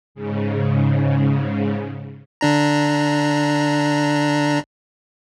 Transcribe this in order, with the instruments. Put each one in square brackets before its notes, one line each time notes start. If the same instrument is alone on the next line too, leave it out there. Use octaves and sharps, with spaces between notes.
[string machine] G#2 C#3
[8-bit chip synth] D3 D4 A#5